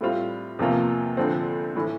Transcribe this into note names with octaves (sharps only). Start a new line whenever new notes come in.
A2 G3 C4 F4
E2 C3 F3 A#3 F4
D2 D3 F3 C4
A2 E3